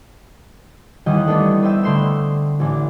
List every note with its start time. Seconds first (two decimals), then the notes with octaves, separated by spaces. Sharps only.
1.06 D#2 D#3 E3 G3 D#5 F#5
1.27 A3 B3 D4 A4
1.62 B4 C5 D#5 E5 G5 E6
1.83 D3 A3 C6 G6 E7
2.60 A1 E3 D4